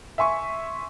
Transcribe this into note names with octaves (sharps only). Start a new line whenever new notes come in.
E5 G#5 C6 C#6